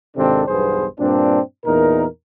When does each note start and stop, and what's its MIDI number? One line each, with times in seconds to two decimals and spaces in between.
0.16 0.44 32
0.16 0.44 48
0.16 0.44 51
0.16 0.44 60
0.16 0.44 62
0.16 0.44 69
0.48 0.86 35
0.48 0.86 40
0.48 0.86 43
0.48 0.86 59
0.48 0.86 68
0.48 0.86 72
0.99 1.40 43
0.99 1.40 46
0.99 1.40 60
0.99 1.40 62
1.65 2.07 40
1.65 2.07 46
1.65 2.07 63
1.65 2.07 70